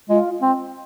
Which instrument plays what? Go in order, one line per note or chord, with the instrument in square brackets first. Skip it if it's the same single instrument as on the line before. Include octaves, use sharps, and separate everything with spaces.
[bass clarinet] G#3 [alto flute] F4
[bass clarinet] C4